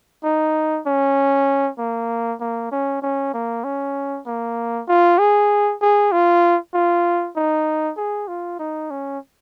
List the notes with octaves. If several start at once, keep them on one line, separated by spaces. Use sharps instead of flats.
D#4
C#4
A#3
A#3
C#4
C#4
A#3
C#4
A#3
F4
G#4
G#4
F4
F4
D#4
G#4
F4
D#4
C#4